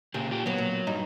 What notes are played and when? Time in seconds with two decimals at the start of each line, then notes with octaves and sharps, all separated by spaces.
0.14 A#2 C#3 G4
0.31 F4 G4
0.46 D#2 F#3 B3
0.58 A#2
0.87 G2 D#4